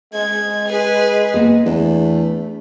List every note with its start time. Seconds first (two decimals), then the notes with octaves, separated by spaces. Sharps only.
0.14 G#3 G#6
0.67 G#4 B4
1.34 A#3 B3 G#4
1.66 E2 A3 D4